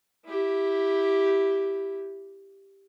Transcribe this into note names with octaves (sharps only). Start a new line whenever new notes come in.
E4 G4